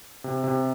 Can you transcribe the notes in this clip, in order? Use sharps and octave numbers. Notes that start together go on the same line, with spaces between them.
C3
C3